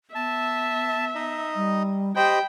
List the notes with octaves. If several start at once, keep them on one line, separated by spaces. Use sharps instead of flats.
B3 E5 A5
D#4 D#5
G3
G4 C5 D#5 G5 B5